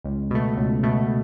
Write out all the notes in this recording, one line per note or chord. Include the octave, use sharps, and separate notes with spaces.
C#2
B2 A3
C#2
B2 A3